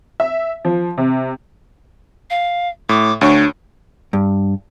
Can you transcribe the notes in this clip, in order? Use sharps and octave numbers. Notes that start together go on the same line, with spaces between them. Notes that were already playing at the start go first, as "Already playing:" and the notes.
E5
F3
C3
F5
A2 D6
D2 D4 C#5 C#6
G2